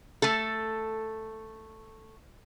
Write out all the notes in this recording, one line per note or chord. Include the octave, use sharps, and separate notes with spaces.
A3 A4